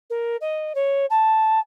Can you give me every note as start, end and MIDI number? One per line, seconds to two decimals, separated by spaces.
0.10 0.37 70
0.41 0.73 75
0.75 1.06 73
1.10 1.59 81